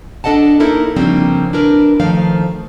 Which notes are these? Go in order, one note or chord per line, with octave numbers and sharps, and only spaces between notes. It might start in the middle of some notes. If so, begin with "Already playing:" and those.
D4 A4 D#5 F#5 A5
A#3 D#4 E4 A4 A#4
C#3 F3 G3 A#3 C4 D4
D4 E4 A#4 B4
D#3 F3 A3 F5